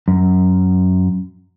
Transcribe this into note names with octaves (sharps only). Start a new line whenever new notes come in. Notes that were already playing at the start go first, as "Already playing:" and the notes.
F#2